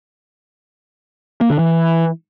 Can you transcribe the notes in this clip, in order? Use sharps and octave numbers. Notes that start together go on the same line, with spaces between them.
A#3
D3
E3